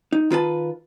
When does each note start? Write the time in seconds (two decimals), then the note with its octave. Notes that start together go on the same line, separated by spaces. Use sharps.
0.12 D#4
0.31 D#3 F4 B4 A5